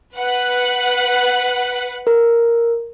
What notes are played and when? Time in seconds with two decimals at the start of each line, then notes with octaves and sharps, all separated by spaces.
0.16 B4 F#5 F#6
2.07 A#4